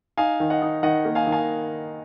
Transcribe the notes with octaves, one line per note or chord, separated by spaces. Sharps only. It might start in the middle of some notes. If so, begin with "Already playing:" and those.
D#4 F5 G#5
D#3
D#5 F#5
D#4
D#3 D#5 F#5
A#3
F5 G#5
D#3
F5 G#5